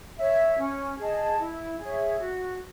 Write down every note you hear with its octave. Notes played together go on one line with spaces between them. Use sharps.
C#5 E5
C#4
G#4 D#5 A5
E4
G#4 C#5 E5
F#4